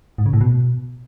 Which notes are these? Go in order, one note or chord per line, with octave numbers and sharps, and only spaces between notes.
G#2
C#3
A2
B2